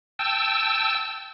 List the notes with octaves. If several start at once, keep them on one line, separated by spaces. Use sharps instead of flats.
G5 A5 E6